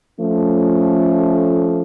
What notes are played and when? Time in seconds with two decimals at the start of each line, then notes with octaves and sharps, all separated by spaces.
0.19 F3 A3 C#4